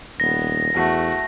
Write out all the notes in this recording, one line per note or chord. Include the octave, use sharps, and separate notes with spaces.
D#1 B3 A#6
E2 A3 F#4